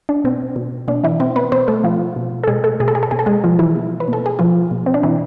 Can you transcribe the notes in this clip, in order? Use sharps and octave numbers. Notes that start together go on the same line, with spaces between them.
D4
B2 C4
B2
B2 D4
E3 E4
B2 C4
B3 B4
B2 C4 C5
A3 A4
B2 F3 F4
B2
A4
B2 G#3 G#4
A3 A4
B2 G#4
A4
G#4
A4
B2 G#4
A4
G#3 G#4
B2 F3 F4
E3 E4
B2
B4
B2
A4
G#4
B2 F3 F4
B2
C4
D4
B2 E3 E4